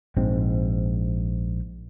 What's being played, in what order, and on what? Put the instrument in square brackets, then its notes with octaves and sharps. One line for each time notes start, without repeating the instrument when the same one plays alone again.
[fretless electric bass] A#1 G#2 C4